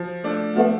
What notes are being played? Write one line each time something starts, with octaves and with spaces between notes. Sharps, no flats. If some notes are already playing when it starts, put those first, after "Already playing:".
Already playing: F3
A3 D4 F4
F3 A3 B3